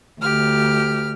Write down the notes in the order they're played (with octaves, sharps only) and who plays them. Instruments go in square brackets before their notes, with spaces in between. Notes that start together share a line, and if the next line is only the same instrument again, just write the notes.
[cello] D2 [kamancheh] G4 F6